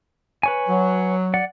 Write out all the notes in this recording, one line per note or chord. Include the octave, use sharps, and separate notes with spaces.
B4 C#5 G#5
F#3
D5 F#5